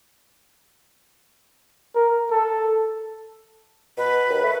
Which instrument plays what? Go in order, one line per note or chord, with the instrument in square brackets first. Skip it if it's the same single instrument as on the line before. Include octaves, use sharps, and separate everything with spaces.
[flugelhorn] A#4
A4
[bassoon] B2 [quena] B4
[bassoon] D#2
A3